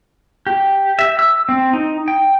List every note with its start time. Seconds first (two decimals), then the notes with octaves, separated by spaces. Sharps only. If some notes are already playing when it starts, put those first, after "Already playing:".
0.47 G4
0.99 E5
1.19 E6
1.49 C4
1.73 D#4
2.08 G5